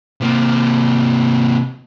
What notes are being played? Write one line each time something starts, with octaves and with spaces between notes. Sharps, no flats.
C3 A#3